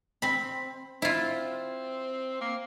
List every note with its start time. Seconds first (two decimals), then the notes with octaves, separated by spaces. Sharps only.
0.22 C4 B5
1.02 C4 E4 F4
2.41 A#3